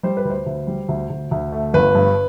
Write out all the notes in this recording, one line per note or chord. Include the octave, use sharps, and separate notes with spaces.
G3 C5
B4
D2
C5
D2
G3
D2
D2
D2
A3
G1 B4
G2